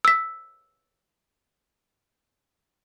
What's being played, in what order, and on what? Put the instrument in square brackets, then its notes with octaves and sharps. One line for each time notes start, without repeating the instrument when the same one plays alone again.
[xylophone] E6 B6